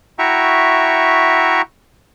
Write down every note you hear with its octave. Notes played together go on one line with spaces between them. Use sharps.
E4 F#4 E5 G5 A#5 C#6